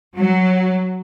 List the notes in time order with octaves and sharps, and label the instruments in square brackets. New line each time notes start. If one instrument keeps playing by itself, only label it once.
[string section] F#3